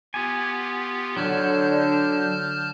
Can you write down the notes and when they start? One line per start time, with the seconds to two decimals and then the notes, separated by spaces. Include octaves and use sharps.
0.14 B3 F4 G4 G#5
1.17 D3 F#3 C#5 A5 F6 G6